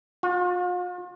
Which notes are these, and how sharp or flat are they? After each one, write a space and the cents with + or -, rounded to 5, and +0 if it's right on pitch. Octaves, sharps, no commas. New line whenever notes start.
F4 +40